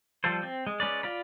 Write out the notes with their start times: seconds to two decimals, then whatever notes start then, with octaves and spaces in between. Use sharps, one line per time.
0.24 F3 G3 F4 A4 C5
0.43 C4
0.67 G#3
0.80 G#3 C#4 B4 D5
1.03 F4 D5 B5